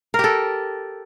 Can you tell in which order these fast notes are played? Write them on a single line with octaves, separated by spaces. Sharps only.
A#4 G4 A4